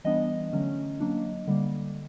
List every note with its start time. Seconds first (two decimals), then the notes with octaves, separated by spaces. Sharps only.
0.05 E3 G3 B3 D4 D#5
0.53 D3 F#3 A3 C#4
1.00 F#3 A#3 D4
1.47 D3 G3 A#3